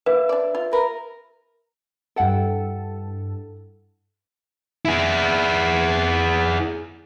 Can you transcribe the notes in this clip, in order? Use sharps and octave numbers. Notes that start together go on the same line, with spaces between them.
A#3 B4 E5
D4 D5
F4
A#4 B4
G2 E4 A4 F#5 G5
E4 G#4